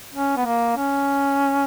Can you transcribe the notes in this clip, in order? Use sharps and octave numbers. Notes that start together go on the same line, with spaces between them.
C#4
B3
A#3
C#4